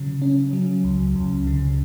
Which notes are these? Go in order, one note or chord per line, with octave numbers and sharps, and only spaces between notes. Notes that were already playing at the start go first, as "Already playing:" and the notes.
Already playing: C#3 F#3
C#4
F#3
C#2
C#2
C#3